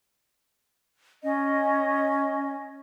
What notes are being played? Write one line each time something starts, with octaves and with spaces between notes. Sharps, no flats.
C#4 D#5